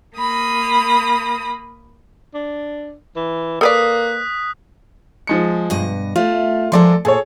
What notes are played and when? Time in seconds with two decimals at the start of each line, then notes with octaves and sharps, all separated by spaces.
0.17 A#3 B5 D#6
2.34 D4
3.16 E3
3.61 A#3 A4 B4 D5 D#6 F#6 B6
5.27 F3 G#3 C#7
5.70 G2 B2 D#5
6.16 A3 F4
6.72 F3 G#3 A4 A#4 D5 C6
7.05 A#2 G#4 A4 C#5